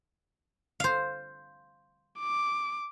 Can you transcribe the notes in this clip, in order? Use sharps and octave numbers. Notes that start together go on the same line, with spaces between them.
C5 F5
D6